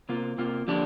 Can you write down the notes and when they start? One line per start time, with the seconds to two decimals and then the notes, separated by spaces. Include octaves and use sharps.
0.09 C3 A#3 F4
0.38 C3 A#3 F4
0.68 D3 F3 A#3 D4 G4